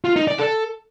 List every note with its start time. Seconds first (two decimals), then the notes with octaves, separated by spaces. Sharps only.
0.05 F4
0.16 D#4
0.28 D5
0.39 A4